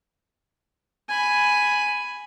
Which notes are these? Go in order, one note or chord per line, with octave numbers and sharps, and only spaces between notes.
G#5 B5